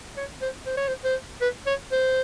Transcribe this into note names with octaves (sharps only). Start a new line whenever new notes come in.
C#5
C5
C5
C#5
C5
C5
B4
C#5
C5